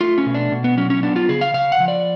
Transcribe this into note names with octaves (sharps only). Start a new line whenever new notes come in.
A3 F4
C#4
B2
D4
B2
B3
F#3 C#4
C#4
B3 D4
F4
C#3 G#4
F5
C#3 F5
F#5
F3
D5